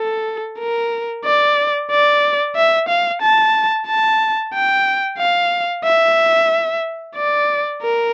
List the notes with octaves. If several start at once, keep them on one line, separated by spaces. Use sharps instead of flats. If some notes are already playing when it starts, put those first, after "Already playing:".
Already playing: A4
A#4
D5
D5
E5
F5
A5
A5
G5
F5
E5
D5
A#4